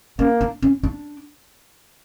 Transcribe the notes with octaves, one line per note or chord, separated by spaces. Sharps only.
A#3 C#4
D4
C#4
D4